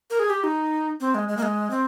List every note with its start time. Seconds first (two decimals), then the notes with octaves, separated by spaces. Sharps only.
0.10 A#4
0.19 G#4
0.30 G4
0.44 D#4
1.00 C4
1.15 G#3
1.28 G#3
1.37 A#3
1.42 G#3
1.70 C4